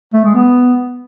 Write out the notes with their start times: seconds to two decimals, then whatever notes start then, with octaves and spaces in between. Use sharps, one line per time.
0.14 A3
0.24 G#3
0.35 B3